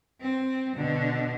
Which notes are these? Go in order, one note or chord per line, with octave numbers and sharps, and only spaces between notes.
C4
B2 D3